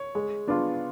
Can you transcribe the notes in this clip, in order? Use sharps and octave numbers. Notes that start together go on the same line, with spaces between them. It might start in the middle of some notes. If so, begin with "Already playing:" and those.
Already playing: C#5
G#3
B3 D4 F4